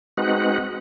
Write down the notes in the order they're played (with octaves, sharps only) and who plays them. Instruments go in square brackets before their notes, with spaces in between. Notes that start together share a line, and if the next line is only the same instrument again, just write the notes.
[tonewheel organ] G#3 C4 D#4 F#4 B4 F#5